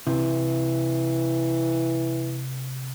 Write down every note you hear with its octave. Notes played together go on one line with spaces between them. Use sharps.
C3 E3